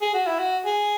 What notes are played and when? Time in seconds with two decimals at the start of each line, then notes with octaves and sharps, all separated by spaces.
0.01 G#4
0.14 F#4
0.27 E4
0.39 F#4
0.65 G#4